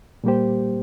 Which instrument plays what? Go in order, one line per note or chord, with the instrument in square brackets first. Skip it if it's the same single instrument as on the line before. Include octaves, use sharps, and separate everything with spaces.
[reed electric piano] A#2 G3 A#3 G4 C5